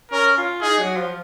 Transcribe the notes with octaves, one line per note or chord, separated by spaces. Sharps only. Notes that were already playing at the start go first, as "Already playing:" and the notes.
C#4 A#4
F4
D#4 G#4
F#3
F3